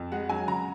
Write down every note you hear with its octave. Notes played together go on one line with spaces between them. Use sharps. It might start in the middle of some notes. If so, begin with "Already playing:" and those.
Already playing: F2
G#3 F#5
F#3 G#5
C#3 A#5